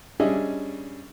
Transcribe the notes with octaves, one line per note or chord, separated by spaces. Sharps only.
G3 C#4 D4 G#4 D#5 E5